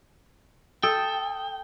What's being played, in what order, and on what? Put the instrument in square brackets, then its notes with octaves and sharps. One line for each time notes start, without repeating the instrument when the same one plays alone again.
[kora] A4 [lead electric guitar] G5 [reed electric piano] D#6